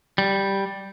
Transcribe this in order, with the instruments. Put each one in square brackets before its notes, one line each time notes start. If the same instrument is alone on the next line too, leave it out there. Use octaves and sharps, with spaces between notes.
[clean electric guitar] G3